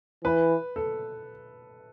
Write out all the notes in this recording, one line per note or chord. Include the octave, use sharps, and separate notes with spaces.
E3 B4
A4